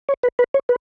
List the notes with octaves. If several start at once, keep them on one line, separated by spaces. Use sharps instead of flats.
C#5
B4
B4
C#5
B4